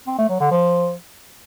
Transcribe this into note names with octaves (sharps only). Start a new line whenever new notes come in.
C4
A3
F#3
D3
F3